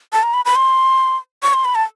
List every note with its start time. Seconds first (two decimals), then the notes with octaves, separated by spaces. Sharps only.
0.13 A5
0.23 A#5
0.34 B5
0.45 B5
0.56 C6
1.43 C#6
1.54 C6
1.65 B5
1.75 A5